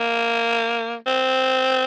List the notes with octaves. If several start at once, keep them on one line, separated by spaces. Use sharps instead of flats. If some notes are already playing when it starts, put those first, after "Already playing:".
Already playing: A#3
C4